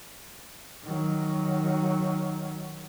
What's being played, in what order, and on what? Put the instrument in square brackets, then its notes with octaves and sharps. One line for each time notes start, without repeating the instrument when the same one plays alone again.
[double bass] D#3 F#3